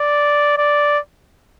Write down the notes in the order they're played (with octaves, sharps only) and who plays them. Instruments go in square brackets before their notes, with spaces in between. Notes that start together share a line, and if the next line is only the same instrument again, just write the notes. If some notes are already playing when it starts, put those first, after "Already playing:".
Already playing: [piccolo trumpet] D5
D5